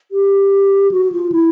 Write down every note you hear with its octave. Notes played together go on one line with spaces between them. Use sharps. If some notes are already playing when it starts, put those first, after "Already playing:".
G4
F#4
F4
E4